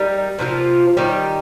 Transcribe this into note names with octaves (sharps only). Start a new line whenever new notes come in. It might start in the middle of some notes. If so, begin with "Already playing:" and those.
Already playing: G3 D#4 A#4
C3 F3 A#3 F4
D#3 G3 D#4 G4